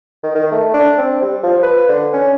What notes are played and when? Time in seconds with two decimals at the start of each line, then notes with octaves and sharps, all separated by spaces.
0.23 D#3
0.35 D#3
0.52 A3
0.74 D4
0.98 C4
1.22 G3
1.43 F3
1.63 B4
1.89 D3
2.14 C#4